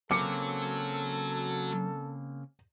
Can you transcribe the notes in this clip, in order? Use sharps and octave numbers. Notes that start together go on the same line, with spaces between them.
C#3 F#3 A#3 C4 A4 D6 C#7